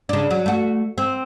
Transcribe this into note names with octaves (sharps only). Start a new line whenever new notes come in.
C#3 D4
F#3
A3 F#4
C4